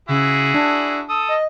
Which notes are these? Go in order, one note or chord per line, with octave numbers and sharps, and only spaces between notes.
C#3 E4 F#4 G#4
D4
A4 D#6
D#5